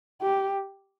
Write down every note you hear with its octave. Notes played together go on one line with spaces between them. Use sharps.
G4